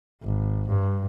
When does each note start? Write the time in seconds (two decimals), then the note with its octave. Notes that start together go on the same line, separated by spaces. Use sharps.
0.23 G#1
0.68 G2